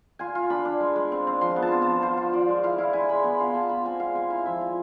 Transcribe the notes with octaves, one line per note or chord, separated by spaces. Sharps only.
F4 G#5
F4
D4 B5
D4
G#3
G#3
C4
C4
F3 C6
B3
A5
F4
F3 A5
F4 C5
F4
F4 D5
G#3
E4 F5
E4 F5
E4 G#5
G#3 B5
B3 G#5
F4 F5
B3 A5
F4 B5
C4 G#5
G#3 F5
G#3 G#5
E4 F5
F3 E5
F4